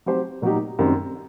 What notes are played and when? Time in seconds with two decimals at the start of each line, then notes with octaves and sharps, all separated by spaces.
0.06 F#3 C4 G4 C5
0.42 A#2 F#3 A#3 D#4 G4
0.79 F#2 D#3 G3 C4